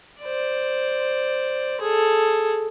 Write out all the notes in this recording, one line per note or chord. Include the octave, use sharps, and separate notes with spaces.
C5 D5
G#4 A4